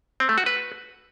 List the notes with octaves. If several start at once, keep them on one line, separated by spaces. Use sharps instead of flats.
C4
A3
F#4
B4